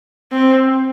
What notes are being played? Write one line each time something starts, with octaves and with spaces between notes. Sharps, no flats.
C4